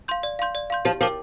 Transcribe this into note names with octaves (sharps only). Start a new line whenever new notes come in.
F5 C6 G6
D5
F5 C6 G6
D5
F5 C6 G6
F3 G4
F3 A#4 G5 D6